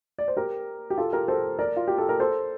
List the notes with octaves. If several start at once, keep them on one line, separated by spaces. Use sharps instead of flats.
D5
C5
G4 A#4
G4
F4 A4
G4 A#4
A4 C5
A#4 D5
F4
G4
A4
A#4
A4 C5